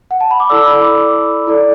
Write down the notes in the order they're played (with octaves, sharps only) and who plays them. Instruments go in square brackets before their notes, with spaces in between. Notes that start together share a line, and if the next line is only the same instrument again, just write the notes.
[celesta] F#5
A5
B5
D6
E4 A4 D5 E6
B5
D6
E4 A4 D5